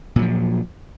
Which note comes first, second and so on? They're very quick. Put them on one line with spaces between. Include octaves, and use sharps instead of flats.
A#2 F#3 F3